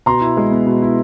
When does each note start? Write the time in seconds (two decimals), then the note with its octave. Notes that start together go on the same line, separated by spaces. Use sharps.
0.06 B2 A#5 C6
0.21 E4
0.37 G#3
0.51 B3
0.67 B2
0.82 E4